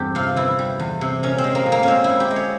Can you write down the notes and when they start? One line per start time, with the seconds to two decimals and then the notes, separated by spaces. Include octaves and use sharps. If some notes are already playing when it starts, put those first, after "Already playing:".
Already playing: E2 G2 C4 G4
0.15 C3 F4
0.36 E3 E4
0.59 G3
0.79 E2
1.01 C3
1.23 A#2 C#4
1.38 C4
1.44 G#3
1.55 A#3
1.66 A#2
1.72 A#3
1.83 G#3 C4 C#4
2.04 E4
2.09 A#2
2.20 G4
2.31 G#3
2.36 C#5